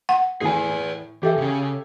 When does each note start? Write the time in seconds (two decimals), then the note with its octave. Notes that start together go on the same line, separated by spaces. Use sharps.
0.09 F#5
0.41 A2 E3 G#4 B4 G#5
1.23 E3 G4 A4 E5
1.38 C#3 C#4